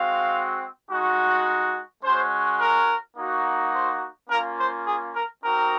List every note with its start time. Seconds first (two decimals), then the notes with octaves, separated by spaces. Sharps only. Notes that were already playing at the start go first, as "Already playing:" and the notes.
Already playing: G#3 C4 F#4 F5
0.90 G#3 D#4 F#4
2.02 G#3 C#4 F#4 C5
2.60 A#4
3.16 A#3 D#4 F#4
3.73 C5
4.30 A#3 C#4 F4 A#4
4.58 C5
4.86 G#4
5.15 A#4
5.43 C4 D#4 F#4 A#4